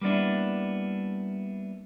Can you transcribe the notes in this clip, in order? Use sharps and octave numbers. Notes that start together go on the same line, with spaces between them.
G3 A#3 B3 D4 E4